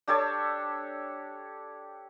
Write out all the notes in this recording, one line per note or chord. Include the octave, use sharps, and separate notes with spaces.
D4 G4 A4 C#5